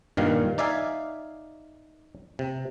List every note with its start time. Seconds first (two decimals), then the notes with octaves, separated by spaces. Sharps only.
0.17 G2 A#2 D#3 F5
0.58 D#4 D5 E5 F5 G#5
2.39 C3